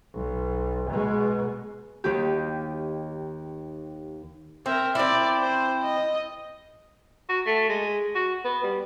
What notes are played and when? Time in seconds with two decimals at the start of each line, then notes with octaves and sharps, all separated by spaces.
0.14 B1
0.90 B2 G#3
2.04 D#2 D#3 G4
4.66 C4 A#4 E5
4.95 C4 E4 D5
5.41 C5
5.83 D#5
7.29 F#4
7.46 A3
7.69 G#3
8.15 F#4
8.44 B3
8.63 G3